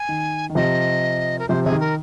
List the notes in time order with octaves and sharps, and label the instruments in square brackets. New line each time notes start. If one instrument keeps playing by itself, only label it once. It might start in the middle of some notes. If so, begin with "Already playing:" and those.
Already playing: [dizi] G#5
[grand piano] D#3
D#3
[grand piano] C3 F3 [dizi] D#5
[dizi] A#4
[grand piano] C3 F3 [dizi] C5
[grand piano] C3 [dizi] G#4
[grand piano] D#3
[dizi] A#4